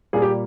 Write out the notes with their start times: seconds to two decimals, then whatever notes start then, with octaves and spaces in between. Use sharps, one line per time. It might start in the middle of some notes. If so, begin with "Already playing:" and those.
0.13 A#2 G3 A#3 G#4
0.22 G4